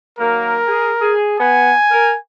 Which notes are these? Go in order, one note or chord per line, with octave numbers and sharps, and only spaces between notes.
D#3 F#3 A#3 A#4
G#4
G#4
B3 F#5 G#5
A#4